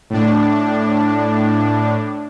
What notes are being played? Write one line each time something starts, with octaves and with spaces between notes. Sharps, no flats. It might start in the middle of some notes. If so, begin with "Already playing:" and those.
A2 D4